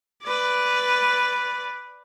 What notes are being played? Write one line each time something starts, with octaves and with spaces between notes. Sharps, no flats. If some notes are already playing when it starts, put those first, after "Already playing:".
B4 D5